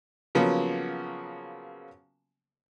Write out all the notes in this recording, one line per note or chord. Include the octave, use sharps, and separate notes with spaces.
C#3 F3 F#3 A#3 B3